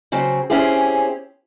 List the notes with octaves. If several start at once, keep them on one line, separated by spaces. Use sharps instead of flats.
C#3 F#3 C4
C4 C#4 E4 G4 G#4